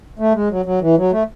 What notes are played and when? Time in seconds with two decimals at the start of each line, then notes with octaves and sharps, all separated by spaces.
0.19 A3
0.35 G#3
0.51 F#3
0.66 F#3
0.82 E3
0.97 F#3
1.12 A3